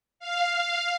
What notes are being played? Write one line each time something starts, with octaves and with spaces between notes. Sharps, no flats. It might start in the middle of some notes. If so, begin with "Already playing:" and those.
F5